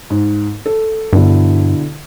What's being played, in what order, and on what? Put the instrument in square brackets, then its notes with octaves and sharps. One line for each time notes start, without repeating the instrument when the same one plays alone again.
[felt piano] G#2
A4
[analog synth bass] G2 [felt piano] B2 D3 E4